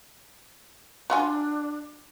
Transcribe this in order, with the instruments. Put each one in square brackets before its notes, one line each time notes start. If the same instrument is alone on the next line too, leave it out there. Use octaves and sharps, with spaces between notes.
[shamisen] F#3 F4 G#5 [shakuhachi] D4